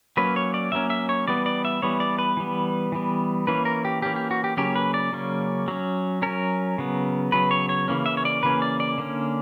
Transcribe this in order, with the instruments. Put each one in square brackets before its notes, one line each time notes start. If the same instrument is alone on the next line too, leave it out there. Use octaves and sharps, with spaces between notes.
[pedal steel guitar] F#3 A#3 C#4 B4
C#5
D5
F#3 A#3 C#4 E5
E5
C#5
E3 G3 B3 D5
D5
E5
E3 G3 B3 C#5
D5
B4
E3 G3 B3
E3 G3 B3
E3 A#3 C#4 B4
A#4
G4
E3 A#3 C#4 G4
G4
F#4
G4
C#3 F#3 A#3 C#4 G4
B4
D5
C#3 F#3 A#3 C#4
F#3 C#4
F#3 C#4 A#4
C#3 F#3 B3
C#3 F#3 B3 B4
C#5
C#5
C#3 E3 A#3 C#4
E5
C#5
D5
C#3 E3 A#3 C#4 B4
D5
D5
D3 A#3 C#4